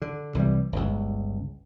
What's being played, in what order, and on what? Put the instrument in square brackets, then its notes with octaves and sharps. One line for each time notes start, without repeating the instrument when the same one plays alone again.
[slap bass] D3
C2 E3 F3 G3
G1 C#2